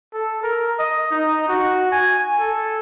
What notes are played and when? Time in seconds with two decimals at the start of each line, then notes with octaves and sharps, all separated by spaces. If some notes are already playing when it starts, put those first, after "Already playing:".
0.13 A4
0.43 A#4
0.79 D#5
1.11 D#4
1.48 F#4
1.92 G#5
2.39 A4